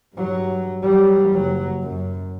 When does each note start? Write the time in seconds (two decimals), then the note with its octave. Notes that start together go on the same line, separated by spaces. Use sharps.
0.15 G2 F#3
0.83 F#3 G3
1.31 F#1 F#3
1.83 F#2